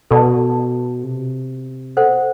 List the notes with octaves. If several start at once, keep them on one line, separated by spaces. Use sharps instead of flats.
B2 A4 D5 A5
C3
B2 A4 C5 F#5